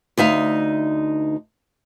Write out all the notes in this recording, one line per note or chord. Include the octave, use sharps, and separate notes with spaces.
D2 D#4 E5 F5